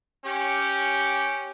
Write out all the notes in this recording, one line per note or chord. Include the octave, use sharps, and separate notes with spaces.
C#4 G4